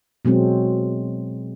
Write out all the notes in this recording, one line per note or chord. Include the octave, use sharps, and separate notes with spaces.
B2 F#3 G#3 C4